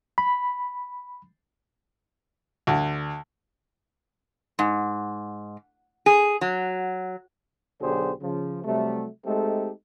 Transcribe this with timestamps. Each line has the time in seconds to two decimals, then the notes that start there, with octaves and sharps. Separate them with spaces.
0.18 B5
2.67 D2
4.59 G#2
6.06 G#4
6.41 F#3
7.81 B1 D3 F#3 G4 G#4 C5
8.21 C#3 F3
8.64 C3 F#3 G3 A3
9.25 G#3 A3 C4 D#4 G4 A4